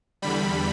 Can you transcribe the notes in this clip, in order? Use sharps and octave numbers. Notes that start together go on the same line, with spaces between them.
E2 D3 G3 B5